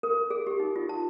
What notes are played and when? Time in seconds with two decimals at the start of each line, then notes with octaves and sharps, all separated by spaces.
0.03 A#4
0.30 G#4
0.47 G4
0.60 D#4
0.76 F4
0.89 A5